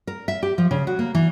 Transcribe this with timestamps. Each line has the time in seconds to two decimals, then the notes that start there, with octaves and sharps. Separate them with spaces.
0.07 A#4
0.28 E5
0.43 G4
0.58 F3
0.71 C#3
0.87 F#4
0.99 A#3
1.15 E3